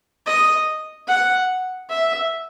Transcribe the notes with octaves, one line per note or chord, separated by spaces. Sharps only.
D#5
F#5
E5